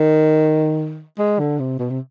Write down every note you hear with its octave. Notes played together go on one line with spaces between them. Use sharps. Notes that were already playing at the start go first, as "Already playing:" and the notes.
Already playing: D#3
G#3
D3
C3
B2
C3